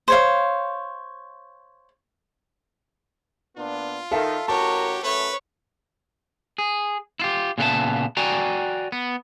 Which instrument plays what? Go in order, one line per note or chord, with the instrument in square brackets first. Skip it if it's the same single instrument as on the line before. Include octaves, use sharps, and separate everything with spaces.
[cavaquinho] C5 C#5 F5
[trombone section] A#2 B3 D4 [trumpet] F4
[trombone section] D#3 [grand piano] A4 E5 F5
[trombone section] A1 F#4 A#4 [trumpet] G4 [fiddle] C#5 [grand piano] A5
[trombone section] F#2 A3 [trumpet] B4 [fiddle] C#5
[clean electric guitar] G#4
E4 F4 G4
A#2 C#3 B3 A#4 E5 A5
F#4 D5 G5 G#5 A#5
B3